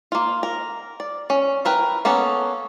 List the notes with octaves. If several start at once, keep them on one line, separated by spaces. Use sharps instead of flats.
A#3 F4
A#4
D5
C#4
E4 A#4 B4 G5
A#3 B3 C#4 A4